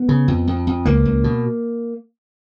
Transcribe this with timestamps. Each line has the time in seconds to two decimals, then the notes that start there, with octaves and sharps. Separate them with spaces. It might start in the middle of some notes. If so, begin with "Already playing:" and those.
Already playing: B3
0.09 C#3
0.28 F2
0.47 F2
0.67 F2
0.85 C#2 A#3
1.05 C#2
1.24 B2